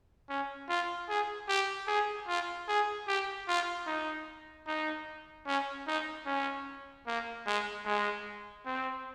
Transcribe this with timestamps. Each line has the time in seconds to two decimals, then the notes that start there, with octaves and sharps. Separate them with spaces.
0.29 C#4
0.69 F4
1.09 G#4
1.48 G4
1.87 G#4
2.27 F4
2.68 G#4
3.07 G4
3.48 F4
3.87 D#4
4.67 D#4
5.46 C#4
5.87 D#4
6.26 C#4
7.07 A#3
7.46 G#3
7.86 G#3
8.66 C4